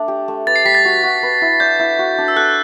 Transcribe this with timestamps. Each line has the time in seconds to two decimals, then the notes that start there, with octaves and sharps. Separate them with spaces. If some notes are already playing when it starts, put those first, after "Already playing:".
Already playing: A3 D4
0.08 G4
0.28 A3
0.47 B4 A6
0.56 C7
0.65 G3 B6
0.75 A6
0.85 F#4
1.04 F#4
1.23 B4
1.41 E4
1.60 D5 G6
1.79 E4
1.99 F#4
2.18 D4
2.28 E6
2.36 A4 F#6